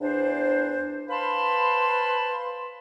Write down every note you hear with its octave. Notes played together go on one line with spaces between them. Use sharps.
E2 D4 C5
B4 C5 F5 A5 B5 C6